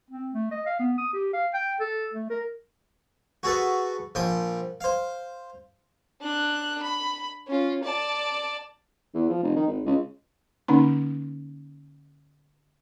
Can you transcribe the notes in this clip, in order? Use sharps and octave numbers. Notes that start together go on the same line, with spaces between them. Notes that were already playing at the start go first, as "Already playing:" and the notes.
C4
A3
D#5
F5
B3
D#6
G4
F5
G5
A4
A3
A#4
F#4 G#4 A4 B4
A#1 F3 G5 D#6
C5 F5
D4 F#6
B5
C#4 F4
D5 A5
E2
F3
F1
D#3
G#1
C#2
D3 A#3 C#4 D#4